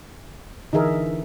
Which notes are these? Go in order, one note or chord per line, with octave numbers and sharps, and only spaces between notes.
D3 E3 D#4 G#4 A#4 E5